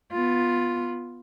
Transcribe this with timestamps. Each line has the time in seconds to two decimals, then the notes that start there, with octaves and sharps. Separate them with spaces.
0.13 B3 F4